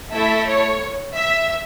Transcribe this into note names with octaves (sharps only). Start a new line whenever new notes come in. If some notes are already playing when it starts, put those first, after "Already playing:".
A3 E4 A4 E5
C#5
E5